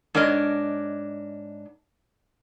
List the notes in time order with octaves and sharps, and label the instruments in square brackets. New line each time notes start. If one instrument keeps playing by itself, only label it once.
[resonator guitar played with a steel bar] G#2 D4 A#4 C#5 D#5